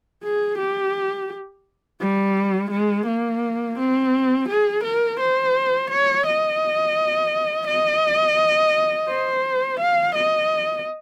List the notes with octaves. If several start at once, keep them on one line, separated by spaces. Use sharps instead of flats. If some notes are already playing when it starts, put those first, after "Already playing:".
G#4
G4
G3
G#3
A#3
C4
G#4
A#4
C5
C#5
D#5
D#5
C5
F5
D#5